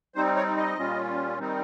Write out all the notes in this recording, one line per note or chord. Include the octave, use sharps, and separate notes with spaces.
G3 C4 D#4 C5
C#5
D#5
A#2 G3 C#4 F4
D#3 G3 C4 D#4